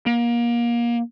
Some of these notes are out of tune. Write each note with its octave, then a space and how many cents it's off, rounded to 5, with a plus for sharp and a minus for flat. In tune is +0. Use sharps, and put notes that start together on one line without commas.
A#3 +25